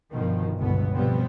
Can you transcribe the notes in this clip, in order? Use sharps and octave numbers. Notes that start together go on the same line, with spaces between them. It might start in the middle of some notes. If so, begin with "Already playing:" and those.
G1 B2 D#3 F3
G1 C#2 B2 B3
B2 F3 G3 B3 C4